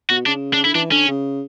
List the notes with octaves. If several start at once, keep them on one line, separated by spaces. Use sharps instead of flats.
B2 F#4
C#3 D4
D4
D3 E4
E3 D4
D3 C#4
C#3